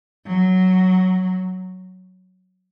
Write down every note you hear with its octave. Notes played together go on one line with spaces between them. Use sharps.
F#3